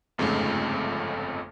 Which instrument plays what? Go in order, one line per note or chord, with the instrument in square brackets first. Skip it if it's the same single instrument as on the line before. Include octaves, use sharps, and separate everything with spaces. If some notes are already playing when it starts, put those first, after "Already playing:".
[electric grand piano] G1 F2 G#2 C#3 A3